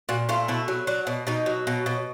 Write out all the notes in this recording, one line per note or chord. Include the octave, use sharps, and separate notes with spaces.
A#2 F#4
A3 F4
B2 E4
F#3
F#3 D4
B2
B2 D#4
F#3
B2
B2